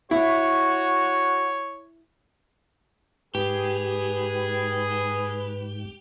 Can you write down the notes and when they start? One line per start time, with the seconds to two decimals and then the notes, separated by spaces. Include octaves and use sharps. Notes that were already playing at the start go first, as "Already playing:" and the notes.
0.11 E4 F#4 C#5
3.35 G#2 G4 G#4 B4